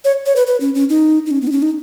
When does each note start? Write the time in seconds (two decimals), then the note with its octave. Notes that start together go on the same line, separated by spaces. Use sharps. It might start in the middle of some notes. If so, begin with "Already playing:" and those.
0.05 C#5
0.26 C#5
0.36 B4
0.47 B4
0.60 C#4
0.75 C#4
0.89 D#4
1.26 D#4
1.31 C#4
1.42 B3
1.47 D#4
1.52 C#4
1.62 D#4